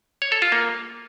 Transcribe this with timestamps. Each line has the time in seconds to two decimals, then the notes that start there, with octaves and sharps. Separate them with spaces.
0.22 C#5
0.32 A4
0.42 F4
0.52 A#3